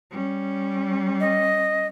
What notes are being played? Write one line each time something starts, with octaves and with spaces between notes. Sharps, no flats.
G3 C#4
D#5